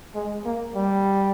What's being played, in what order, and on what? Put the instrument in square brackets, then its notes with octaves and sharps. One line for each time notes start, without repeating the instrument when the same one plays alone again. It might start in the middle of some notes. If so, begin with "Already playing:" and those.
[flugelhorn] G#3
A#3
G3